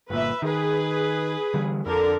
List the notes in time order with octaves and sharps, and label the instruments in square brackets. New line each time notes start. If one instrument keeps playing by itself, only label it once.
[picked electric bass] G1 A#2 [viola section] B4 E5
[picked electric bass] D#3 [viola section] G#4 B4
[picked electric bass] D3 E3 G3
[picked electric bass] F2 [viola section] D3 A4 A#4